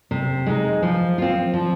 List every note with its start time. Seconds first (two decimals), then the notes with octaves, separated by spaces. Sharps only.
0.11 C3
0.46 G#3 D#4
0.82 F3
1.18 C4 F4
1.54 F3